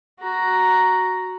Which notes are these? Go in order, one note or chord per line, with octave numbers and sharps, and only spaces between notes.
F#4 A#5